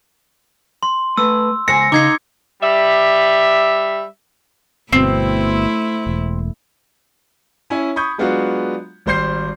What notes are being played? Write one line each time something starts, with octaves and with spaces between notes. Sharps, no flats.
C6
A3 B4 E6
C#2 C5 G#5 A#6 C#7
C#3 D#4 D6 G#6 C7
G3 E5
G1 B2 A3 C4 E4
E1
C#4 E4 C#5 G#5
B5 C#6 D#6 G6 G#6
F#3 G#3 B3 D4 F4 F#4
G#1 G3 C5 C6 G6 C7